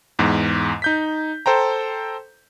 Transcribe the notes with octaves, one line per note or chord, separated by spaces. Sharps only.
E2 G#2
D#4 G6 B6
A4 C5 G5 A#5